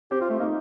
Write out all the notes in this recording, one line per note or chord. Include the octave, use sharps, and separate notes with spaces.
C4 G4
F4
A3
A#3 D#4